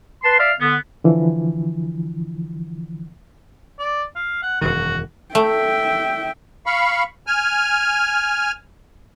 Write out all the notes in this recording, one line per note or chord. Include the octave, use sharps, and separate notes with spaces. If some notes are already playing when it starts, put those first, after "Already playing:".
B4 A5 C6
D5 E5 F5
D3 B3
D3 E3 F3
D5
F5
F#5
E1 F#2 D#3 F#4
A3 E5 G5
F5 B5 C#6
G#5 F6